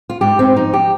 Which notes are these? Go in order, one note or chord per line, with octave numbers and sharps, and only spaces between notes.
F4
G#2 G4
C4
F3 D#4
G4